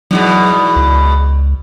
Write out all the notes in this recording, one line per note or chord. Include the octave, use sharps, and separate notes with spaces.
E2 G#2 B2 F#3
C#2